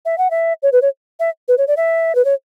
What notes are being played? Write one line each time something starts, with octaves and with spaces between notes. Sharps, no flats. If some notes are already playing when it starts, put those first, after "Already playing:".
E5
F#5
E5
C#5
B4
C#5
E5
B4
C#5
D5
E5
B4
C#5